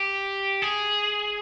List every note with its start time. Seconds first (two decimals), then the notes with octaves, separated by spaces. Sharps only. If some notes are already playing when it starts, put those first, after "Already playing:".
Already playing: G4
0.62 G#4